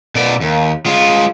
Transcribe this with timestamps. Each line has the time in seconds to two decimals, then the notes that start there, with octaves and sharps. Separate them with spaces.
0.15 B2 D5
0.41 D#2
0.86 G#3 F4